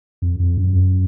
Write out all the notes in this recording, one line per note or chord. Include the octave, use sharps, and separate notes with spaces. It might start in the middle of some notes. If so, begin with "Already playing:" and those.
F2
F2
F#2